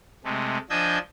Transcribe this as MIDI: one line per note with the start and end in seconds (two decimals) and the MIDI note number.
0.24 0.58 48
0.24 0.58 56
0.24 0.58 57
0.70 0.98 53
0.70 0.98 62
0.70 0.98 75
0.70 0.98 80
0.70 0.98 88
0.70 0.98 91